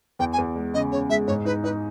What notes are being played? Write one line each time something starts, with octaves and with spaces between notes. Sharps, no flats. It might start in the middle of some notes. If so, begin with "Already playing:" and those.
E2 G5
G#5
E2
G#3
C#3 D#5
C#3 C#5
G#3 E5
G#2 C#5
D#4 B4
D#4 B4